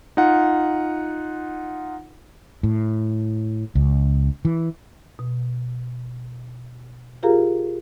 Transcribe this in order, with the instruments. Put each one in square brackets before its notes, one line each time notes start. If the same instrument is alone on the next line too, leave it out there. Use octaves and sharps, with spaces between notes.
[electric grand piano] D#4 F4 F#5
[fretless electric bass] A2
C#2
E3
[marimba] B2
F4 G4 G#4 A#4 F5 A#5